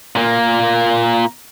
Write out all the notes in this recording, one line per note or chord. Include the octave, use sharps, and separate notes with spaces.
A#2 A#3